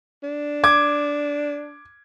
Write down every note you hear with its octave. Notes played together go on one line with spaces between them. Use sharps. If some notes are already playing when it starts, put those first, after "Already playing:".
D4
D6 G#6